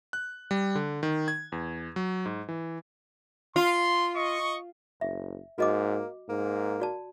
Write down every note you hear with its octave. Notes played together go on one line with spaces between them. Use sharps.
F#6
G3
D3
D#3
G#6
E2
F#3
G#2
E3
F4 C6
D#5 C#6
F#1 E5
G#2 A#3 F#4 D#5 D6
G#2 A#3
F#4 D5 A5